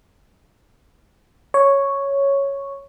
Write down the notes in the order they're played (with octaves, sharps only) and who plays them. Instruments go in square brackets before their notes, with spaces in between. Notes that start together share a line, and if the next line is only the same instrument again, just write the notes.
[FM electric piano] C#5